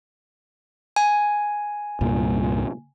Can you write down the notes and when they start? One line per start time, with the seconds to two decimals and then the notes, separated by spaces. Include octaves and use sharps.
0.96 G#5
2.01 C2 G2 A#2